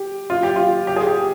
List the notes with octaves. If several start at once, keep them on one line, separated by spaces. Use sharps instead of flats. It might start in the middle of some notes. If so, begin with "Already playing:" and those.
Already playing: G4
F4
G4
F4
G4
G#4
G4